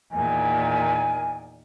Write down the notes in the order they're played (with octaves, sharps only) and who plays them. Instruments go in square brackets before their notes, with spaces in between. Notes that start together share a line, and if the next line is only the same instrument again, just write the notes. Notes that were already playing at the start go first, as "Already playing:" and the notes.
[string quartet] E2 A#2 D#3 [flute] G#5